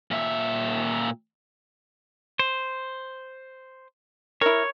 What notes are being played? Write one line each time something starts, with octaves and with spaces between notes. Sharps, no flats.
A#2 E5
C5
E4 A#4 C#5